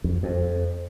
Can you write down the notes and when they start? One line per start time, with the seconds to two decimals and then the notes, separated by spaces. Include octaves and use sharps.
0.04 F2
0.23 F2